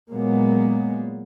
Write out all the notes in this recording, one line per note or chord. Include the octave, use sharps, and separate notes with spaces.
A#2 F#3 G#3 A#3 B3